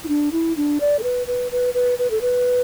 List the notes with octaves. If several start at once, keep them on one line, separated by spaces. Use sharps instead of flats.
E4
D4
E4
D4
D5
A4
B4
B4
B4
B4
B4
A4
B4